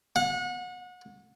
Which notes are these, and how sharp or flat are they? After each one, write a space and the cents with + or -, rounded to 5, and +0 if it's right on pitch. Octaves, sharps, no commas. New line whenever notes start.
F#5 -30